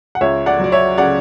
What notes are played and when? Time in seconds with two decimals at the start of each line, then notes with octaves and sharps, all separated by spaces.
0.15 F#5
0.21 C#2 C#5 E5
0.46 D5 F#5
0.59 F#3 D5
0.72 C#5 E5
0.98 C#3 D5 F#5